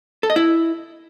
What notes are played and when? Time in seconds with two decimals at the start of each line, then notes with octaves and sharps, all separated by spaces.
0.23 A4
0.30 D#5
0.36 E4